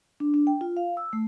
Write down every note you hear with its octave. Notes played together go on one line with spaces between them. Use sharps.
D4
D4
G5
F4
F5
E6
A3